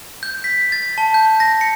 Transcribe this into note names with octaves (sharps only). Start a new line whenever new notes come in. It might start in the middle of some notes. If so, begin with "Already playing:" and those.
G6
B6
A6
A5
G6
A#6
C#7